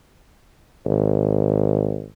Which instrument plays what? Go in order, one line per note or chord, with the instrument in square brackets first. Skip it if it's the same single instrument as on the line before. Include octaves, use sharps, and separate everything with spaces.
[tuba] G#1